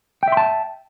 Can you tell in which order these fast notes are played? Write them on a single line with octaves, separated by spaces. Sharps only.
G5 E5 C6 A5